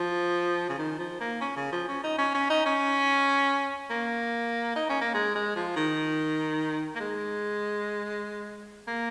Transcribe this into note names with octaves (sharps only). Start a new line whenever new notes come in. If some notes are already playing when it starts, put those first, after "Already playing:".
Already playing: F3
C#3
D#3
F3
A#3
C#4
C#3
F3
C#4
D#4
C#4
C#4
D#4
C#4
A#3
D#4
C#4
A#3
G#3
G#3
F3
D#3
A#3
G#3
A#3